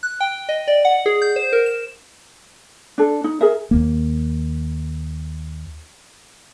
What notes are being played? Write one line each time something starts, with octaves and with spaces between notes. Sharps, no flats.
F#6
G5
D#5
D5
F#5
G#4
G6
C5
A#4
E7
D4 A4
D#4
G#4 A#4 E5
D#2 A#3